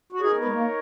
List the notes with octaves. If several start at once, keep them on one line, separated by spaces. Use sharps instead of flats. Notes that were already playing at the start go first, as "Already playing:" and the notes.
F#4
D#4 G#4 A#4 C#5
B3
G#3
A#3